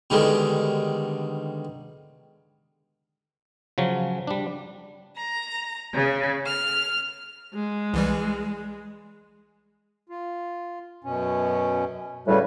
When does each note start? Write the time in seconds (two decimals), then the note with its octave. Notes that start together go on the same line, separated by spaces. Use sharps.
0.10 B2 D3 D#3 G3 G#3
3.78 C#3 F3 F#3 C#4
4.27 G3 D4
5.16 A#5
5.94 C#3
6.45 F6
7.54 G#3
7.94 C2 E3 G3
10.09 F4
11.04 F#2 B2 C#4
12.27 A2 C#3 G3 F#4 B4